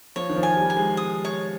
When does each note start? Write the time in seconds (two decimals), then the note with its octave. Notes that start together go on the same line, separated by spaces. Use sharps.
0.16 F3 C#5
0.29 D#3
0.36 F3
0.43 G#5
0.57 G3
0.70 G#5
0.77 G#3
0.97 D#6
1.25 C#5